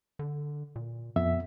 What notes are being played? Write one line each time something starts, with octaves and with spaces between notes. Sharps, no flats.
D3
A#2
F2 B3 E5